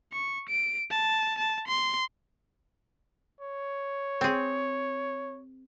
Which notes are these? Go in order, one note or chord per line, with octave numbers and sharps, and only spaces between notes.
C#6
D7
A5
A5
C6
C#5
C4 G#4